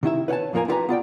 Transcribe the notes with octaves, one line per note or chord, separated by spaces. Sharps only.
C3 D#3 E4 E5
B4 C#5 F#5 G#5 A5
F2 A#2 F3 A#3 A#4 G#5
E4 F4 G4 B4 G#5 A#5
B3 F4 D5 G5